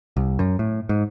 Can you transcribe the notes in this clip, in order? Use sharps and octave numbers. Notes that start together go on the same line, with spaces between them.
C2
F#2
A2
G#2